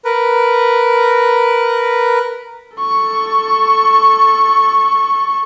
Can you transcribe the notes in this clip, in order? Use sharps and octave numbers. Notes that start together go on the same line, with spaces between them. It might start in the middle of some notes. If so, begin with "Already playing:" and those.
A#4 B4
A4 C#6